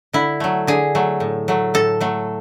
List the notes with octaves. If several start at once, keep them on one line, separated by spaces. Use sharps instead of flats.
D3 E4
F#3 A3
D3 G#4
F#3 A3
A2
F#3 A3
A2 A4
F#3 A3